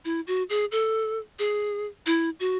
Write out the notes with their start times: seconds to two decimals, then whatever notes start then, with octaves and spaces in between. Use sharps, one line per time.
0.05 E4
0.27 F#4
0.49 G#4
0.72 A4
1.39 G#4
2.06 E4
2.40 F#4